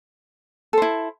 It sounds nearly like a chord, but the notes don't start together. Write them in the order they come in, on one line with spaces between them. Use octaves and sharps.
A4 C5 E4